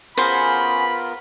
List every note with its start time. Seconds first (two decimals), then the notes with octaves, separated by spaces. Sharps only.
0.18 B3 C#4 F4 F#4 G#4 A#4 C5 B5